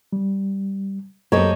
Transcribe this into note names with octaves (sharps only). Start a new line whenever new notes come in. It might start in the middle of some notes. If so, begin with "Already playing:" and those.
G3
F#2 A#3 G4 A4 C#5 D#5